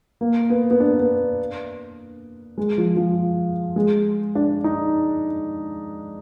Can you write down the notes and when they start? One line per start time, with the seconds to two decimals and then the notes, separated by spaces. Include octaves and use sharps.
0.21 A#3
0.50 B3
0.71 B3
0.80 D4
1.00 B3
2.58 G#3
2.78 F3
2.96 F3
3.76 G#3
4.35 D4
4.64 D#4